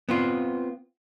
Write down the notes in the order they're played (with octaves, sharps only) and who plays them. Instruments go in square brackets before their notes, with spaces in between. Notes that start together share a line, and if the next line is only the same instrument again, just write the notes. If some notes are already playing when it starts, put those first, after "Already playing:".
[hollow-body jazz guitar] B3 C4 F4